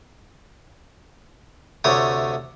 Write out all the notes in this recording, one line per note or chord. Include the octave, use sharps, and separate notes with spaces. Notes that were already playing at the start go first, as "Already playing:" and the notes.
D2 C3 A3 C#5 D#6